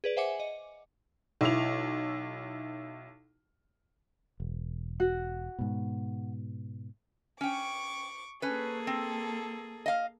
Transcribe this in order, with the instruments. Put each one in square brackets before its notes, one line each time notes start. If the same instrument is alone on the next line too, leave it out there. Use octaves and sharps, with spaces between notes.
[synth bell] G#4 B4 D5
C5 E5 F#5 G#5 D6 C#7
D#5
[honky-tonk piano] B1 E4 F7
[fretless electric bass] E1
[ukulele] F#4
[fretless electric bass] G#2 B2
[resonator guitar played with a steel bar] C#4 G5 [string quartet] C#6 D6
[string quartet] A#3 G#4 A4 [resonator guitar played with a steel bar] C#4 B4
[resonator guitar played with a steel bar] C4
D#5 F5